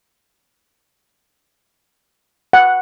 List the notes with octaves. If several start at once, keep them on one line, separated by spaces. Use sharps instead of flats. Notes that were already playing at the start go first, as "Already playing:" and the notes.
F#5